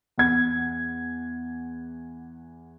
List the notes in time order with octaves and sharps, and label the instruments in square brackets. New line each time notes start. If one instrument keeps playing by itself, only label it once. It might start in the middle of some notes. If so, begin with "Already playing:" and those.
[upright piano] E2 F#5 G#6